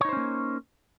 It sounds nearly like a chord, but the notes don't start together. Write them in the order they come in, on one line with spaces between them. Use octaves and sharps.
C#5 D#4 C5 C#4 A#3